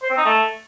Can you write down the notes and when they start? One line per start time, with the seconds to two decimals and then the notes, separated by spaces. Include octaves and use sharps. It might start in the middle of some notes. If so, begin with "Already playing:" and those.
0.02 C5
0.10 C4
0.17 D#4
0.25 A3